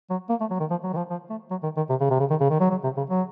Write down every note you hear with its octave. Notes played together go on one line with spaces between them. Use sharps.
F#3
A#3
A3
F#3
D#3
F3
F#3
D#3
F3
F3
A3
F#3
D#3
D#3
C3
C#3
C3
C#3
D#3
C#3
D#3
F#3
F#3
C3
C#3
F#3